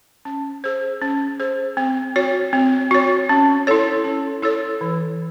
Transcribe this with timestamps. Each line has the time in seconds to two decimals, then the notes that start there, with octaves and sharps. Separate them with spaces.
0.25 C#4
0.64 G#4 C5
1.02 C#4
1.40 G#4 C5
1.77 C4
2.16 F#4 C#5
2.53 C4
2.91 F#4 C#5
3.29 C#4
3.67 E4 A4 C#5
4.04 C#4
4.42 E4 A4 C#5
4.81 E3